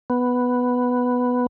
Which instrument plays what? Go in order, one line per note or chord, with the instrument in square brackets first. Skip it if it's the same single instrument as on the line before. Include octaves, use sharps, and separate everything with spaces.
[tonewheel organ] B3